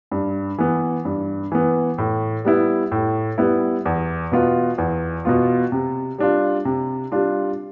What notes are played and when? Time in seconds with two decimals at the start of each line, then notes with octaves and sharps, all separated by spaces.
0.11 G2
0.58 E3 B3
1.05 G2
1.52 E3 B3
1.98 A2
2.45 G3 B3 E4
2.92 A2
3.38 G3 B3 E4
3.85 E2
4.32 B2 B3 F4
4.78 E2
5.25 B2 B3 F4
5.72 C3
6.18 G3 D4 F4
6.65 C3
7.12 G3 D4 F4